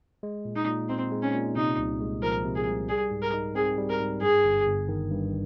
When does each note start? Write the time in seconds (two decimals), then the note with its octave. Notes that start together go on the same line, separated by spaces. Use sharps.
0.23 G#3
0.45 A#2
0.56 D#4
0.68 A#2
0.89 C4 D#4
1.12 G#3
1.22 C#4
1.34 A#2
1.56 C3 D#4
1.78 C2
2.00 G#3
2.22 F3 A#4
2.45 C3
2.55 G#4
2.67 C2
2.89 G3 G#4
3.11 G#2
3.22 A#4
3.33 D#4
3.55 C4 G#4
3.78 G3
3.89 A#4
4.00 G#2
4.21 G2 G#4
4.44 G1
4.66 G1
4.88 D#3
5.11 G2